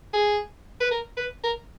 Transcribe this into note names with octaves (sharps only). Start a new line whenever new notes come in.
G#4
B4
A#4
B4
A#4